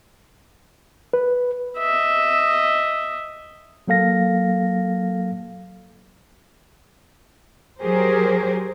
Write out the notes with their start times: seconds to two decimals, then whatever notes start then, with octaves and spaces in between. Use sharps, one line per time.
1.13 B4
1.79 D#5 E5
3.88 F#3 A#3 A4 F5 A#6
7.81 F#3 G4 G#4 A#4 C5